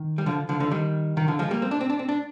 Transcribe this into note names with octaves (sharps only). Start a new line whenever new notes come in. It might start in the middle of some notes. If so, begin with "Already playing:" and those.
Already playing: D#3
G3
D3 F3
D3 F3
D3 F3
D#3 G3
D#3
D3 F3
F3 G#3
G3 A#3
C4
D4
C4
D4
C4
D4